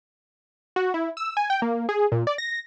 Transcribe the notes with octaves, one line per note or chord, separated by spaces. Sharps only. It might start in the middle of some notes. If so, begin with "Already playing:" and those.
F#4
E4
E6
G#5
G5
A#3
G#4
A#2
D5
A#6